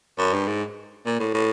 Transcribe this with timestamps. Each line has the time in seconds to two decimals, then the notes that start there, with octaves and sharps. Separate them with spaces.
0.18 F#2
0.33 G2
0.47 G#2
1.06 A#2
1.20 A2
1.34 A2